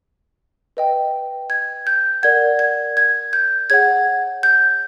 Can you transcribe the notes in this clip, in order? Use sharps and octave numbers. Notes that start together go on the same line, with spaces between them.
B4 D#5 G5
G#6
G6
A#4 D5 F#5 G#6
G#6
G#6
G6
G#4 C#5 F#5 G#6
G6